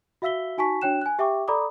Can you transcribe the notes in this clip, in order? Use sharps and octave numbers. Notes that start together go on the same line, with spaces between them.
F#4 E5 F5 E6 B6 G7
D#4 F#4 G#5 A5 C#6 B6
D4 F#4 C#5 G5 F#6 E7
G#5 F#6
G4 E5 G5 C#6 D6
A4 D5 A#5 B5 D6 D#6